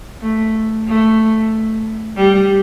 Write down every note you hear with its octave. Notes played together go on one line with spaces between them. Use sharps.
A3
A3
G3